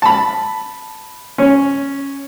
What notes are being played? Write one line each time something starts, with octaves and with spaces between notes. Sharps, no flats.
A5 B5
C#4